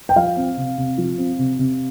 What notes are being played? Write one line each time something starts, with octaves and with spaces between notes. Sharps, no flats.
G5
F3 F5
C4
C3
C3
F3
C4
C3
C3